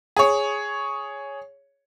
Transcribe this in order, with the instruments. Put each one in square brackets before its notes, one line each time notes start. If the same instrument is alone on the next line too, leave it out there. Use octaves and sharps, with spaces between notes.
[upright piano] G#4 C#5